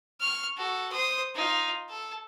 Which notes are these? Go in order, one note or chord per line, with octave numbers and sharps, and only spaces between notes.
C#6 F6
F#4 A4
C5 D#6
D#4 F4
A4